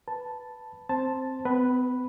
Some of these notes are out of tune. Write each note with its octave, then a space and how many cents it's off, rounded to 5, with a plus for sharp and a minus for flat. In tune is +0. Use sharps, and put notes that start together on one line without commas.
B4 +0 A5 +0
C4 +0 C5 +0 A5 +0
B3 +40 B4 +0